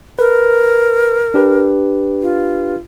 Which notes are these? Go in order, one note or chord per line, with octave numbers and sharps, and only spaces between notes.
A#4 B4
D4 G4 B4
F4